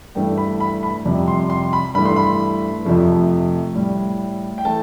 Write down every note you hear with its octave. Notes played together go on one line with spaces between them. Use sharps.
G2 E3 A3 G5
B5
B5
B5
F2 C3 G3
C6
C6
B5
G2 E3 A3 B5
C6
B5
F2 C3 F3 A3
A2 G3
G5
E3 A3 A5